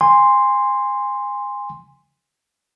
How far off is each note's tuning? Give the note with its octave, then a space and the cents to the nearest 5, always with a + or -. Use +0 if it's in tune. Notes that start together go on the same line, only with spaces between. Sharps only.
G#5 -25 C6 +0